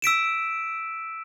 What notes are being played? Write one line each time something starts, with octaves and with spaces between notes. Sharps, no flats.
E6 B6 D7 E7